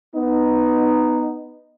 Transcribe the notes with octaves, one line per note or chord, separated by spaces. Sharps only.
B3 D#4